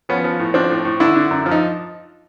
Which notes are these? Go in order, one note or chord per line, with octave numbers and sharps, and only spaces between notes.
F3 B3 C#4
F3
A2
F3 C4 D4
A2
A2
D3 D4 E4
D3
F#2
F3
D#4